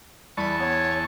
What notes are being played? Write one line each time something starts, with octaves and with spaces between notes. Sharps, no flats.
E2 G3 A5 B5 C#6
B3 C#5